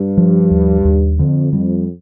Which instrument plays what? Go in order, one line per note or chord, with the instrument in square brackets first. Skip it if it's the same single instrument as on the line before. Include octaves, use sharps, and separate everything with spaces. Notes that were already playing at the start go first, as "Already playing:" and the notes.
Already playing: [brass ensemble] G2
[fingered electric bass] F3
D#2
D#2
[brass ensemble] F2 [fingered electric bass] D3
[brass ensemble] F2 [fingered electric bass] G3